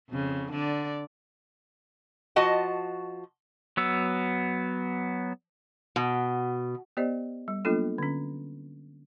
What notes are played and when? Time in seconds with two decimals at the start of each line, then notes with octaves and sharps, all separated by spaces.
0.10 F2 C#3
0.51 D3 D5
2.36 F3 F#4 D#5 F#5 A5
3.77 F#3 B3 E6
5.96 B2
6.97 B3 G4 C5 D5 D#5
7.48 G3
7.65 F#3 A#3 B3 D4 F4 A4
7.98 D3 C#4